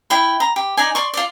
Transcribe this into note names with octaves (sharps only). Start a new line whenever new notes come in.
E4 G5 B5
A#5
G4
D#4 D5 G#5
D5 C6 C#6
F4 D5